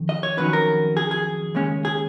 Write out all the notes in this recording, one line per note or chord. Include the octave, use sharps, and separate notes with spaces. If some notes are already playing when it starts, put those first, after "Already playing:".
Already playing: F2 D#3
D#5
C#5
F2 D#3 F#3 C#4 B4
A#4
G#4
G#4
D#2 C#3 G#3 C#4
G#4